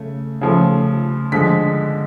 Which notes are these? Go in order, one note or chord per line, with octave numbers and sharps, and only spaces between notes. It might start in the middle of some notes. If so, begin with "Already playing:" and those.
Already playing: C#3 A3
C#3 F3 A3
D3 F3 G#3 B6